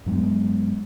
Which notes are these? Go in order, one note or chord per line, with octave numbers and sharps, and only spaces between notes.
G2 F#3 G#3 B3